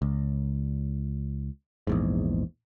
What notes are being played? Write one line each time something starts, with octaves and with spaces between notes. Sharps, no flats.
C#2
A#1 E2 G#2